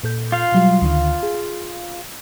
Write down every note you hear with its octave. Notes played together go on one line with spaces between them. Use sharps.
A#2 A4 G6
F4 F5
B2 F#3 G3
D2 D3 D#3
G#4